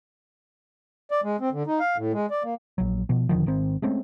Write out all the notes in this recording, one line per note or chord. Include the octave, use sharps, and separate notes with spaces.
D5
G#3
C4
D3
D#4
F5
A2
G#3
D5
A#3
A#1 F#3
B2 F3
E1 D3 D#3 F3
G#1 D#3 C4
G#3 A3 C4 C#4